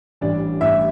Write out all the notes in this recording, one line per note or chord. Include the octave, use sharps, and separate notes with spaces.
A1 A2 E3 G3 D4 D5
A1 A2 E3 G3 E4 E5